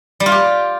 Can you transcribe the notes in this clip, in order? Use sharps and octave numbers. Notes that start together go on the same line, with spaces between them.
G3
F4
G4